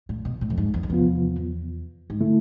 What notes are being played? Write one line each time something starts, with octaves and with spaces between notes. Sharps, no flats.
A2
B2
A2
F2
G#2
E2
F2
E2 C3 F3 B3 F4
G#2
D3 A3 E4